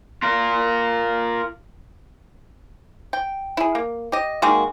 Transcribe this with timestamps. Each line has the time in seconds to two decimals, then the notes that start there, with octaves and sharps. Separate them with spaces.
0.22 F4 A#4
3.13 G5
3.57 E4 G#4
3.75 A#3
4.12 G4 D#5
4.42 D#3 G#3 A#3 F#4